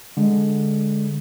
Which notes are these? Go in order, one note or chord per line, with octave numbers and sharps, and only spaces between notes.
D3 G#3